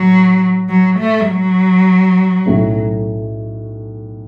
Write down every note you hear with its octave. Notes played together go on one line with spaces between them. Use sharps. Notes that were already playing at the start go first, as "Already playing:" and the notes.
Already playing: A2 F#3
F#3
A3
F#3
B1 A2 A3 C#4